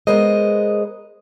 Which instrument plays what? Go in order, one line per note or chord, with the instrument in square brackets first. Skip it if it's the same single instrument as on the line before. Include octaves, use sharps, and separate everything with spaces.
[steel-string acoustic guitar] G#3 B3 G#4 A#4 C5 D#5